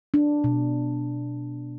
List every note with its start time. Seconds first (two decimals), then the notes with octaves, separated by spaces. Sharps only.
0.14 D4
0.44 B2